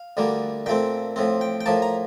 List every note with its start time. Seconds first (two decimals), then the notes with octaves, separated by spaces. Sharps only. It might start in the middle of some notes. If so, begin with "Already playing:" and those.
Already playing: F5
0.17 D2 D3 G3 A#3
0.66 A#2 A3 C4 G5
1.16 A2 F3 C4
1.41 G5
1.61 G5
1.66 A2 F3 A#3 A5
1.82 A#5